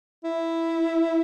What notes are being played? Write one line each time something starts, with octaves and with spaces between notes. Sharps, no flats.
E4